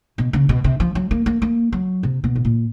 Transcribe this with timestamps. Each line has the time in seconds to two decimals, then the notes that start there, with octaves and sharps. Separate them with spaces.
0.18 B2
0.33 C#3
0.49 B2
0.64 C3
0.80 F3
0.95 F#3
1.11 A#3
1.26 A#3
1.42 A#3
1.72 F#3
2.03 C3
2.24 B2
2.36 A2
2.45 A#2